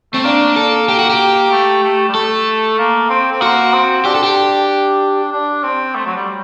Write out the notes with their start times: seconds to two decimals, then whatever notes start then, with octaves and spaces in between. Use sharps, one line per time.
0.13 A3 C4
0.24 A#3 D4
0.56 A4
0.89 G4
0.99 F#4
1.10 G4
1.51 A3
1.83 A3
2.09 G3
2.15 A3 A4
2.79 A#3
3.10 C4
3.32 C4
3.41 A#3 F#4
3.73 C4
4.05 D4 G4
4.15 A4
4.23 G4
5.32 D4
5.63 C4
5.95 A3
6.06 F#3
6.16 G3